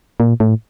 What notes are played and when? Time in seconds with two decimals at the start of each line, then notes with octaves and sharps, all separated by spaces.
0.20 A#2
0.40 A2